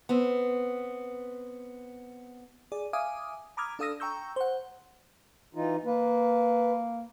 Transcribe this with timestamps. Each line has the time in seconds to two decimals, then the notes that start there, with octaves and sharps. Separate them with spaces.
0.09 B3 C4
2.72 G#4 D5
2.93 E5 F5 G#5 D6 D#6
3.57 A#5 B5 D6 D#6 F6 G#6
3.79 D4 A4 F5 D#6 E6 A#6
4.00 G5 A#5 C#6 E6 G6
4.36 C5 F#5
5.55 E3 D#4 F4
5.85 A#3 B4